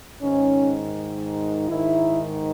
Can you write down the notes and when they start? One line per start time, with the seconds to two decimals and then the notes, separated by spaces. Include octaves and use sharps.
0.21 G#2 D#3 C#4
1.68 G#2 D#3 E4